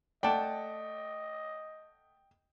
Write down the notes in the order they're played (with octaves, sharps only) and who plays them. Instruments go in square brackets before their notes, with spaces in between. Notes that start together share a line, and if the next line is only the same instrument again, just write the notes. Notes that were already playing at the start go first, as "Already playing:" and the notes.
[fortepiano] A3 F#5 [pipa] D5 A5 [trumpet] D#5 [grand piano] G5